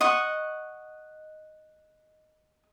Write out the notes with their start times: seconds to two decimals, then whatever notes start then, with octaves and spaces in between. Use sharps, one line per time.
0.01 D#5 F#5 C#6